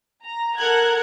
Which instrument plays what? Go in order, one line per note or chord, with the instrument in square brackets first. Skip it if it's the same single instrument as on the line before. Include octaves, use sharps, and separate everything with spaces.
[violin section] A#5
A4 A#4 F#5 F#6 G#6